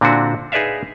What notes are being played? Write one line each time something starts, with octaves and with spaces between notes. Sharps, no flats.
A#2 D3 C4 D4 E4 F#4
D#4 G#4 B4 D5 E5 F5